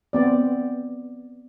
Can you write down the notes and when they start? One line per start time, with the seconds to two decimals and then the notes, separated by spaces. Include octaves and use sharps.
0.13 B3 C4 D5